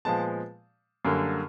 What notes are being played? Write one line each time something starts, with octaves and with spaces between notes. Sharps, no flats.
A#2 F3 G#3 B3 A5
F#2 D3 G3 A#3